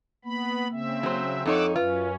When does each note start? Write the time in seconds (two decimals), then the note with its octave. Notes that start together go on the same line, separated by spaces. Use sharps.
0.25 A#3 B3 B5
0.72 C#3 C4 E5
1.03 F#3 C5
1.46 F2 D#4 A4 C#5 F#5 D6 E6
1.76 F#2 C#4 F4 B4